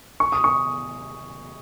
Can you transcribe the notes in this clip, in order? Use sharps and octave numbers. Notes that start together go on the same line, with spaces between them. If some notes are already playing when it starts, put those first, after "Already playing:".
C#6
D#6
C#6